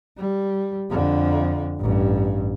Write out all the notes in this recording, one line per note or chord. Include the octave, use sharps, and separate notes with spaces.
G3
F2 D3
A1 G2